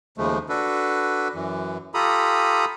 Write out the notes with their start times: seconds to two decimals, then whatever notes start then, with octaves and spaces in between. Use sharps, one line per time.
0.18 D#2 C#3 F3 G#3 A3
0.49 D4 F#4 A4 B4
1.34 F#2 E3
1.94 F4 G4 A4 A#5 B5 D#6